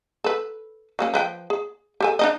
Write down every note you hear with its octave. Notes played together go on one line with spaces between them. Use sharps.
A4 B4
F#3 A#3 C#4
F3 B4 G5
G#4
G4 A4 G#5
D4 D#4 D#5